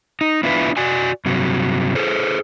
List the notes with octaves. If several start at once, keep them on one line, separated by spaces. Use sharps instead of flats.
D#4
B3 D4 E4 F4 B4
F#4 D5 G#5
G2 C3 F#3
G#4 A4 C5